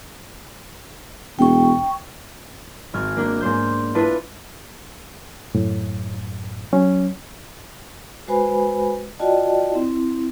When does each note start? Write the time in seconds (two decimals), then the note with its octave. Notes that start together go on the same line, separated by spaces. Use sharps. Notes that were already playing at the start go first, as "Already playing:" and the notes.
1.39 E1 G5 C#6
2.94 G#1 F6 G#6
3.17 A#3 D4
3.41 G#2 A#3 C5 G6
3.95 D4 E4 F4 A4 B4
5.54 F#2 A2
6.73 F#3 C#4
8.28 G#3 F#4 B4 C5 G#5 B5
9.19 F4 F#4 D5 D#5 G5 A5
9.71 C4 E4